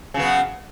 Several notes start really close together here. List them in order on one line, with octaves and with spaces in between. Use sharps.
C#3 F#3 B3